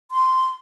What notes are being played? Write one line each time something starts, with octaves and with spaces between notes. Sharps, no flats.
C6